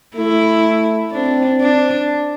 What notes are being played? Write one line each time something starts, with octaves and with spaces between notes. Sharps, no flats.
A3 E4
C4 D4
D4